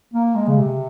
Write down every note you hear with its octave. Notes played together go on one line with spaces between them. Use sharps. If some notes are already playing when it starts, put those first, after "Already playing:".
A#3
G#3
C#3
C3